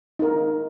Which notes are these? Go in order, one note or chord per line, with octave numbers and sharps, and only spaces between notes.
D#4 A#4